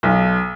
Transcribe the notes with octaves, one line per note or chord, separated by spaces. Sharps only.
B1